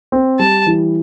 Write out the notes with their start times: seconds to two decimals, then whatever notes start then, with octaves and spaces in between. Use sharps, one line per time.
0.12 C4
0.39 G3 A5
0.67 E3